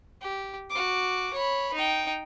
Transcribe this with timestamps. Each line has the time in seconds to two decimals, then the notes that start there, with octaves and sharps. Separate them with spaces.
0.21 G4
0.70 F#4 D6
1.34 C#5 B5
1.74 D#4 G5